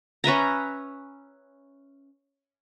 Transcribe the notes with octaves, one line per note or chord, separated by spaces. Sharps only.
C#4 B4 E5 A#5